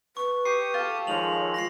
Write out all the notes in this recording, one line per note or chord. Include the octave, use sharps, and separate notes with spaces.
B4 C#6
G4 C#6 D#6 C7
F4 A4
D#3 F3 G#3 C#5 F7 F#7
F4 A#6 C7